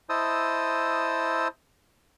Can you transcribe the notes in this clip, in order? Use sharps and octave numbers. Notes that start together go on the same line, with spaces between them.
E4 C5 D#5 A5 D#6 E6